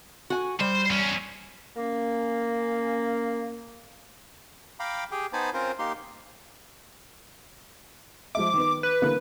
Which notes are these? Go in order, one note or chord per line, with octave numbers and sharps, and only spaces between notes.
F#4 G#5
G3 C5
E2 C#4
A#3 C#4
F5 G5 A#5 B5 D6
G4 G#4 G5
B3 D#4 C5 G#5 A5 B5
C4 C#4 F4 A#4 C5
A#3 D#4 G4 C6
F3 G#3 E5 D6
D#3 B3
B4
D3 E3 A#3